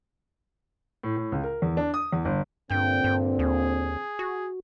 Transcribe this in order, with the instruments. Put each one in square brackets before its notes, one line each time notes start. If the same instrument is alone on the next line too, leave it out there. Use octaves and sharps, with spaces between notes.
[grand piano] A2
A2
C#2
A#4
E2
D4
D#6
E2
G1
[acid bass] G2 [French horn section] A#2 D3 C4 [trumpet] G5
[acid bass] G2
[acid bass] D#2 [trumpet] G#4
[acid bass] F#4